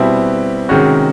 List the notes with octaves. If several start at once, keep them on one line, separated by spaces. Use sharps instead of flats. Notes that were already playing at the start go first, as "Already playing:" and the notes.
Already playing: B2 G3 C4 E4
C3 D#3 G#3 C#4 F#4